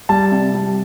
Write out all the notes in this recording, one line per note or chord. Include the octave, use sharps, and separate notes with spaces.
G3 A5
C3
G3